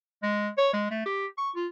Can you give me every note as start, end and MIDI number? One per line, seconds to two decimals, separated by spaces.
0.23 0.49 56
0.58 0.69 73
0.73 0.88 56
0.91 1.05 57
1.06 1.26 67
1.38 1.51 85
1.56 1.67 65